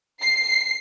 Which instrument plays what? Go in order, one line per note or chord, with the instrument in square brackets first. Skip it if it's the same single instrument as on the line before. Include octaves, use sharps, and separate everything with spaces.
[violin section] C7